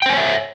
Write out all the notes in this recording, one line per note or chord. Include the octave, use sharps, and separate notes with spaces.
C5 C#5 E5 G5 G#5